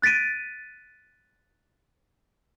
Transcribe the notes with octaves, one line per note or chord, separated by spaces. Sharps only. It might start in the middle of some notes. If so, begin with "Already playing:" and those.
F#6 A6 B6 D7 D#7